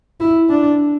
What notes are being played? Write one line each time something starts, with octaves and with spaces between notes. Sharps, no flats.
E4
D4